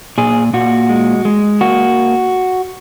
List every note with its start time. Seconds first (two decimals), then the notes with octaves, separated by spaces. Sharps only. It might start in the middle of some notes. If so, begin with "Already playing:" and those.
0.18 A#2 G#4
0.53 A#2 F#4
0.89 G#3
1.25 G#3
1.61 A#3 F#4